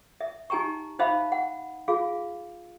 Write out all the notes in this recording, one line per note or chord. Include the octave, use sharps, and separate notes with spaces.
E5
D#4 G4 G#5 A#5 C#6
D#4 C5 E5 F5 A5 B5
F#5
F4 G#4 F5